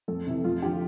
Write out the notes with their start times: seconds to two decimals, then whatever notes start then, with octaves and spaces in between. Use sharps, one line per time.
0.08 F2 A4
0.27 C3 E3
0.44 F2 F4
0.62 D3 F3 G4